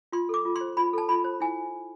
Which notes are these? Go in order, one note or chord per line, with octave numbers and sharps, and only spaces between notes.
F4 C6
A4 D6
F4
C6
C5
F4 B5
A4 A5
F4 B5
C5
E4 G#5